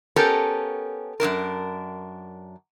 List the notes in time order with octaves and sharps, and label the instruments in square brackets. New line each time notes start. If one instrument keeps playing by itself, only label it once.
[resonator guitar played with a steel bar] B3 C#4 G4 A4 A#4
F#2 C3 D4 A#4